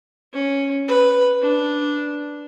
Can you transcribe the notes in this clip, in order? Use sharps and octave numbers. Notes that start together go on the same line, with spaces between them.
C#4
B4
D4